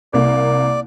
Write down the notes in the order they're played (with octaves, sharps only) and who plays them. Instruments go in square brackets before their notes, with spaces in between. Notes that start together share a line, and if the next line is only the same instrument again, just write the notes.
[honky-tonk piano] C2 A#3 [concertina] D5